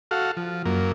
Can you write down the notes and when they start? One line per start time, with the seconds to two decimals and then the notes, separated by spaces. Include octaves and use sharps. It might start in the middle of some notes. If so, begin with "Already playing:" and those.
0.11 F#4 A4 F5
0.37 F3
0.65 F#2 A#3